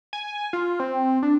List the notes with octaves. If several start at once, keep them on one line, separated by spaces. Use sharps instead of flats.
G#5
F4
C4
D4